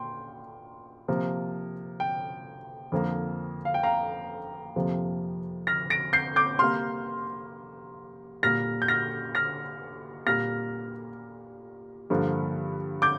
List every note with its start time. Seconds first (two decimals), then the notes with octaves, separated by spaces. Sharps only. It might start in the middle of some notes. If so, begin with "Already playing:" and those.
Already playing: A#2 G5 C6
1.08 C3 F3 A#3
2.00 G5
2.92 F2 D3 F3 A#3
3.65 F5
3.74 G5
3.83 F5 A#5
4.76 F2 C3 F3 A#3
5.67 F6 A#6
5.90 A#6 D7
6.13 G6 C7
6.36 D6 G6
6.59 C3 G3 A#3 C6 F6
8.43 A#2 G3 A#3 F6 A#6
8.82 G6
8.88 F6 A#6
9.35 F6 A#6
10.27 A#2 G3 A#3 F6 A#6
12.10 G2 D3 F3 A#3
13.02 D6 G6